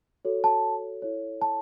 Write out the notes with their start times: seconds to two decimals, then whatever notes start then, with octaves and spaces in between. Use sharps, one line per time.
0.25 F#4 A4 C#5
0.44 A5
1.02 E4 A4 C#5
1.42 A5